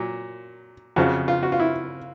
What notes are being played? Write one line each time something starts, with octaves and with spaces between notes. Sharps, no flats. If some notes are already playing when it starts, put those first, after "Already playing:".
Already playing: A#2 F#3
F2 C#3 F3 F#4
F4
F#4
F4
E4